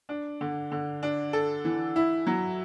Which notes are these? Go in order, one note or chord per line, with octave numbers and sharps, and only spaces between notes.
D4
D3
D3
D4
A4
E3
E4
F#3